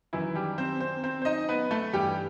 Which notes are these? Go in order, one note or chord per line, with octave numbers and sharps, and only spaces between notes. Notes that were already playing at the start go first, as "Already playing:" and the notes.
F#2 D#3 E3 E4
G3 G4
C4 C5
C4 C5
C4 C5
C5
D#4 D#5
B3 B4
A3 A4
G2 E3 G3 G4